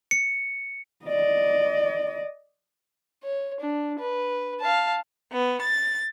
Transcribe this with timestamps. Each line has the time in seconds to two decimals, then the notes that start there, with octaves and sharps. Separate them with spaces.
0.11 C#7
1.06 D5 D#5
3.23 C#5
3.59 D4
3.99 B4
4.60 F5 A5
5.31 B3
5.62 A6